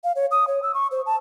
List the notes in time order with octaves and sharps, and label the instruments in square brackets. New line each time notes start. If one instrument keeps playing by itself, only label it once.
[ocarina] F5
C#5
D#6
C#5
E6
C#6
C5
A5